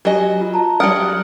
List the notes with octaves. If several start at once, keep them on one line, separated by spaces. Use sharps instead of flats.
F#3 G4 D#5 G#5
F4
A5 A#5
F#3 G3 F#5 D#6 F6 D7